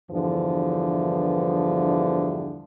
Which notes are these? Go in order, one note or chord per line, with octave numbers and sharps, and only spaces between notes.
E2 G2 D3 E3 F3